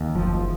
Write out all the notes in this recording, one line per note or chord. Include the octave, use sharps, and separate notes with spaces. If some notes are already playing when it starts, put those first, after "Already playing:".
Already playing: D#2
F#1 F3